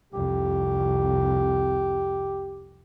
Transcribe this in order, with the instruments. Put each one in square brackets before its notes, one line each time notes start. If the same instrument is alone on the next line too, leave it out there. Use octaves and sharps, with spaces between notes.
[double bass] C2 F2 [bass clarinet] G4